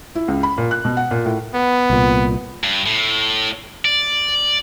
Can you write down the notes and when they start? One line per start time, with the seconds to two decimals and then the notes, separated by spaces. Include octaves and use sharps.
0.15 E4
0.28 C#2
0.43 B5
0.58 A#2
0.71 F#6
0.85 B2
0.97 F#5
1.11 A#2
1.25 A2
1.55 B3
1.90 C2 A#2
2.64 G2
2.86 A2
3.85 D5